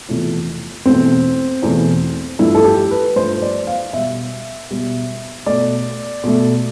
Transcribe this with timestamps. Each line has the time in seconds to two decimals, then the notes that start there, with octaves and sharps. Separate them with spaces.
0.09 E2 C3 F3 A3
0.86 E2 B2 A3 C4
1.63 E2 B2 A3
2.39 G2 F3 A3 E4
2.55 A4
2.65 G4
2.91 B4
3.16 G2 F3 A3 C5
3.42 D5
3.67 F5
3.93 B2 G3 E5
4.70 B2 G3
5.46 B2 A3 D5
6.24 B2 A3